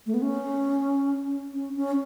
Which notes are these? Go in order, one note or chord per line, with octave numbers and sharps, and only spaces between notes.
A3
B3
C#4
C#4
C#4